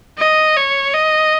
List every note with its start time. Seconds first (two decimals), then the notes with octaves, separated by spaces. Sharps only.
0.18 D#5
0.57 C#5
0.94 D#5